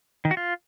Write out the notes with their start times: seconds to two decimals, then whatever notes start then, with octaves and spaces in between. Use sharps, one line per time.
0.25 D#3
0.31 F#4
0.37 F4